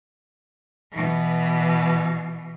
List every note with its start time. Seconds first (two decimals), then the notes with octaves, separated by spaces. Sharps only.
0.92 B2 E3